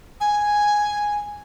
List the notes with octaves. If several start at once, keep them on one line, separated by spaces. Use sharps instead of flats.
G#5